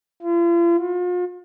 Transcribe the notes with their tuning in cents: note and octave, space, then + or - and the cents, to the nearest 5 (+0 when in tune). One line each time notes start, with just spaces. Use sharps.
F4 -40
F4 +40